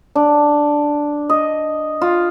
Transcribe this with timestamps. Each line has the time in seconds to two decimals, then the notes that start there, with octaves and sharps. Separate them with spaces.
0.15 D4
1.30 D#5
2.01 F4